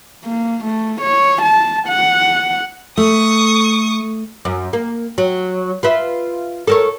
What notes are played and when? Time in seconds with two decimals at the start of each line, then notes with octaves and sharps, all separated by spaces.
0.25 A#3
0.64 A3
1.01 C#5
1.42 A5
1.88 F#5
2.97 A3 C#6 D#6
4.45 F#2
4.73 A#3
5.18 F#3
5.83 F4 B4 E5
6.67 A4 A#4 C#5